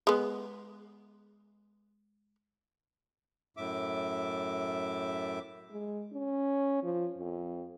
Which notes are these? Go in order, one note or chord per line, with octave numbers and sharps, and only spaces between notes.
G#3 B3
F#2 A2 E5 D6
G#3
C#4
F3
F2